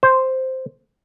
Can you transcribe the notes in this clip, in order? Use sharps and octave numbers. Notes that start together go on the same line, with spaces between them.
C5